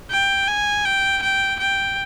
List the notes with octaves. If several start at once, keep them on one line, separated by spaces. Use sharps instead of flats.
G5
G#5
G5
G5
G5